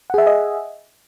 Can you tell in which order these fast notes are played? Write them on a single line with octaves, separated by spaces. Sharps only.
F#5 G#4 E5 G#5 D#5